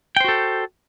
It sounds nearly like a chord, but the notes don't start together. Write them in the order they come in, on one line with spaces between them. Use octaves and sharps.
G5 C5 F#4 A4